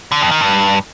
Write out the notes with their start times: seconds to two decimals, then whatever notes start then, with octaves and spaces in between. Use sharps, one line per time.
0.12 D3
0.21 F2
0.31 D#3
0.41 G2